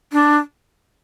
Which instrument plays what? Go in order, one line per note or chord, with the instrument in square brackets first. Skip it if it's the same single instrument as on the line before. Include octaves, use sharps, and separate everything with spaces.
[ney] D4